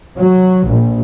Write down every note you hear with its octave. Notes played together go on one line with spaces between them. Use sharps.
F#3
A#1